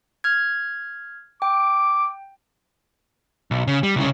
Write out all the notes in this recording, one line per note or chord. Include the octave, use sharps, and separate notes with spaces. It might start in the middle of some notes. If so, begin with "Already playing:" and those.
F6 G#6
G5 D6
B1
C#3
G3
C2 C#3